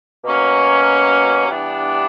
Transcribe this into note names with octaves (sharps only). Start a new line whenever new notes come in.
B2 F#3 A#3 C#4
G2 E3 B3 D4 G4